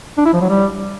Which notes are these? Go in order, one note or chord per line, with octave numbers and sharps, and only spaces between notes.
D4
E4
F3
F#3
G3